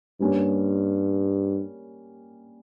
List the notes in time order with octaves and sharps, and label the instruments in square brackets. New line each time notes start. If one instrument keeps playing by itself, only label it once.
[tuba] G2 [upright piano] G3 A#3 C#4